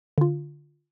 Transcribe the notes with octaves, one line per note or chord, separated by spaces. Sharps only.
D3 F4